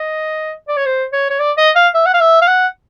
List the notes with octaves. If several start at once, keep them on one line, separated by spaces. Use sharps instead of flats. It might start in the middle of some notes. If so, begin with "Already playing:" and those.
Already playing: D#5
D5
C#5
C5
C#5
C#5
D5
D#5
F5
E5
F#5
F5
E5
F5
F#5